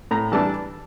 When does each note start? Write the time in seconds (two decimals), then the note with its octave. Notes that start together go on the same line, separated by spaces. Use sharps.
0.11 A2 A#5
0.32 E3 G3 D4 A5